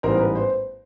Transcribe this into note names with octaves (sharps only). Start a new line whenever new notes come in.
A1 G#2 E3 G3 B3 A#4 C5
B4
C5